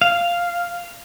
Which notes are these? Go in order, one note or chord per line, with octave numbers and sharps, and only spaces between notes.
F5